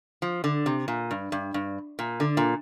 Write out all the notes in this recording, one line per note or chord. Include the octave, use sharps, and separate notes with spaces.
F3
D3
C3
A#2
G2
G2
G2
A#2
D3
A#2